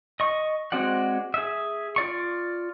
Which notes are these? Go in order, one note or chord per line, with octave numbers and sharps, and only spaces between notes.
D#5 C#6
G#3 C4 F#4 D5 F#5
G#4 E5
F4 D5 C#6